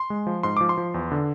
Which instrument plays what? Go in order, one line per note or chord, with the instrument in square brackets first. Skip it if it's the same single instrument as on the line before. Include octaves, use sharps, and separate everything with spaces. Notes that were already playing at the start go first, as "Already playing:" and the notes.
Already playing: [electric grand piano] C6
G#3
F3
G#2 C6
F3 D6
C6
F3
E2
D3